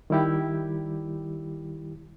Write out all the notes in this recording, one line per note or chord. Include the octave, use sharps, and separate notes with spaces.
D#3 G3 E4 G4